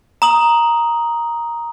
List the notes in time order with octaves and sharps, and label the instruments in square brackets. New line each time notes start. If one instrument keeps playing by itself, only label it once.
[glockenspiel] A#5 D#6 F#7